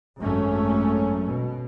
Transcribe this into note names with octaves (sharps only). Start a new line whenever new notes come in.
G#1 F#2 A3 C#4
B2